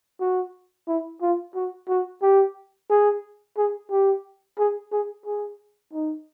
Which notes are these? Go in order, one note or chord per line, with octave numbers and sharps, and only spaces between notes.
F#4
E4
F4
F#4
F#4
G4
G#4
G#4
G4
G#4
G#4
G#4
D#4